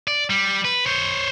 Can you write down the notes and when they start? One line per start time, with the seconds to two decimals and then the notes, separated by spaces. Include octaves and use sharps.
0.08 D5
0.30 G3
0.65 B4
0.86 C5 C#5